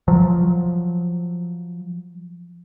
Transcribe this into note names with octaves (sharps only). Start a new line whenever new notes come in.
F3 F#3